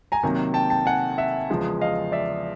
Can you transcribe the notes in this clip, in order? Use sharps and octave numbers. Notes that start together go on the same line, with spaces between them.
G#5 A#5
C3 D#3 F#3 A#3
G5 A5
G5 A5
F#5 G#5
E5 F#5
E2 C#3 F3 G#3
D#5 F5
D5 E5